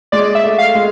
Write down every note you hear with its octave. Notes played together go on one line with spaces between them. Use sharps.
G#3 D5
E5
A3
F5
G#3